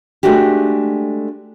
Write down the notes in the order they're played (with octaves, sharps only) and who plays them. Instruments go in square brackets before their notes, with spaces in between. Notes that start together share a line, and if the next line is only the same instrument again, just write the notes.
[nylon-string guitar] G#3 A3 D4 F#4 G4